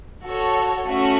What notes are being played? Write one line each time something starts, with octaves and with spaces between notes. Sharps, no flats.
F#4 A4 C#5
A3 C#4 F#4